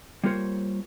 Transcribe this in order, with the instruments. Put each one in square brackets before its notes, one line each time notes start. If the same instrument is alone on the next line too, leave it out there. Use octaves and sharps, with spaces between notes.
[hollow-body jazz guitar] G3 A#3 F4 A#4 C5 C#5